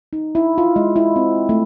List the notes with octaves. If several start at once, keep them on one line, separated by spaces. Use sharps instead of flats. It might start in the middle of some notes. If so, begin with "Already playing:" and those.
D#4
E4
F4
G#3
E4
C4
A3